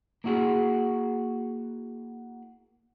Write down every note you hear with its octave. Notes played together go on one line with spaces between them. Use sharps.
A#3 E4 F#4 G#4